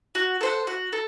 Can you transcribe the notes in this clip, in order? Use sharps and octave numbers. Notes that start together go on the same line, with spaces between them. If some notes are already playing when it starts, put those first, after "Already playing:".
F#4
A4 C5 F#5
F#4
A4